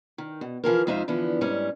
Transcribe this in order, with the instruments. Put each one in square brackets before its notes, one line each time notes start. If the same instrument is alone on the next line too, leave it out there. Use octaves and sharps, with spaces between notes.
[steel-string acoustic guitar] D#3
B2
E3 F3 G#4 A#4
F2 G#3 D#4 C5 E5 F5
D3 E3 F3 B3
G#2 G3 C#4